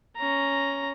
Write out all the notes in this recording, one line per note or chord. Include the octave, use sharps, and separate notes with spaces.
C#4 A#5